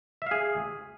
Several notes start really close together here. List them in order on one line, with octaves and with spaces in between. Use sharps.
E5 F5 G#4